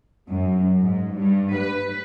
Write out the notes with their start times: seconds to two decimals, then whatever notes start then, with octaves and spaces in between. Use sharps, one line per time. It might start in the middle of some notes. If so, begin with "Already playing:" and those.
0.29 F#2
0.80 G#2
1.14 G2
1.54 B4